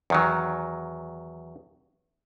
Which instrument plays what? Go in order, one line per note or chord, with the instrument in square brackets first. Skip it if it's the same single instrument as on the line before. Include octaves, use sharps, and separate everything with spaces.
[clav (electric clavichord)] E2 D#3 F#3